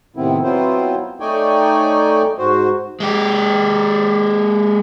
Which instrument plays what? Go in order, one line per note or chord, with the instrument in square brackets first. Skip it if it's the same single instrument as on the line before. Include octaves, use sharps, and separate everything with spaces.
[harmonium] A2 C3 D#3 B3 C4 E4
F#3 B3 C4 E4 F4 C5
A3 D#4 C#5 D5 G5 G#5
G#2 F#4 C5
[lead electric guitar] G#3 G4